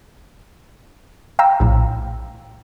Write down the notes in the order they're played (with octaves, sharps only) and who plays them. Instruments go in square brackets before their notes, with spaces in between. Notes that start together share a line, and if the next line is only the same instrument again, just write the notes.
[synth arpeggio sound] F5 G5 A#5 E6
A#1 A2